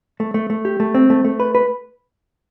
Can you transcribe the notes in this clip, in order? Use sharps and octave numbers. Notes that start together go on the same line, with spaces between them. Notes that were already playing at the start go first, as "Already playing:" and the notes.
A3
A3
A3
G4
A3
C4
A3
A3
B4
B4